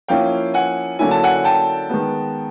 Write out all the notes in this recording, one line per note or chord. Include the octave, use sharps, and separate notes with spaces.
F3 A#3 C#4 E4 F5 G5
F#5 G#5
D3 F#3 A#3 C#4 E4 G#5
A5
F#5 G#5
G5 A5
D#3 G#3 B3